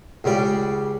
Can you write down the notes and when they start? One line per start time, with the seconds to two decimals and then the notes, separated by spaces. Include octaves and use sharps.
0.24 C#2 C#3 G3 D5